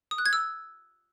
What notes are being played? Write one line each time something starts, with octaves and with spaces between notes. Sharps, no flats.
D#6
F#6
G#6
E6